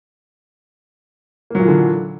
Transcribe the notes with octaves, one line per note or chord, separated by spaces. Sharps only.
A#2 D3 E3 F#3 A#3